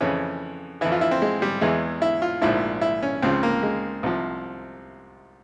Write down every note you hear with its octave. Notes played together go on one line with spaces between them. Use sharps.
F2 C#3 E3 C#4
F2 E3 E4
F4
E4
C4
G#3
G3
E2 E3 G#3
E4
F4
A#1 G#2 F3 E4
E4
C#4
C#2 C#3 F3 C4
A#3
G#3
C2 C3 F3